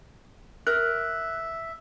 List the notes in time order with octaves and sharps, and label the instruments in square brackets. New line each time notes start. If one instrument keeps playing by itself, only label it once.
[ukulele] A#4 [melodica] E5 [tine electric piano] F#6